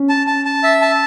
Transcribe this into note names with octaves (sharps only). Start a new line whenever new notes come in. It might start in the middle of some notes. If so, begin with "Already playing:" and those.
Already playing: C#4
A5
A5
A5
E5
A5